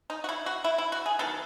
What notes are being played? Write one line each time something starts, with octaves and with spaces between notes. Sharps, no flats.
D#4
F#4
E4
F#4
E4
E4
F#4
G#4
D#3 F#3 B3 A4